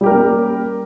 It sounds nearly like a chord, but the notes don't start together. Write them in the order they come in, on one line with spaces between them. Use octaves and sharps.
G3 G4 A#4 A#3 C#4